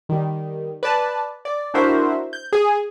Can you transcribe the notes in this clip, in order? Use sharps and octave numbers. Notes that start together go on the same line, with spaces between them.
D#3 G3
B4 D5 A5
D5
D4 E4 F#4 A#4 C5 E5
G6
G#4 G#5